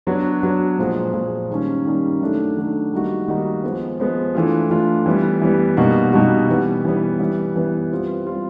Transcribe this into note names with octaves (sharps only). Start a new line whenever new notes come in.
F#3 B3 D4 F#4
F#3 B3 D4 F#4
A#2 F3 G#3
A#2 F3 G#3
D#3 G3 A#3 C#4
D#3 G3 A#3 C#4
D#3 F#3 A3 D4
D#3 F#3 A3 D4
D#3 G3 A#3 D#4 F#4
D#3 G3 A#3 D#4 F#4
F3 G#3 B3
F3 G#3 B3
E3 A3 D4 F4
E3 A3 D4 F4
E3 G3 B3
E3 G3 B3
B2 G3 A#3 D#4 F#4
B2 G3 A#3 D#4 F#4
E3 G3 B3
E3 G3 B3
E3 G3 B3
E3 G3 B3
G3 C4 F4
G3 C4 F4